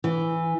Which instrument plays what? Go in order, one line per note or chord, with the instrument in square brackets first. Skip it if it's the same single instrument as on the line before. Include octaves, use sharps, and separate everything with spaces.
[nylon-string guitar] E3